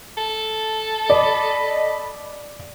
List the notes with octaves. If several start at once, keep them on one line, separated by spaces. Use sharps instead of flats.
A4
D5 D#5 B5